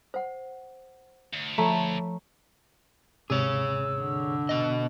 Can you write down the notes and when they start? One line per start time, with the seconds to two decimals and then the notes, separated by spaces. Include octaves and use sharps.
0.14 C5 F#5
1.34 D2
1.58 F3 A3 C#5 A#5 B5
3.30 D#2 G#2 C3 G#4 C#5 E6
4.00 D3
4.49 B2 D#5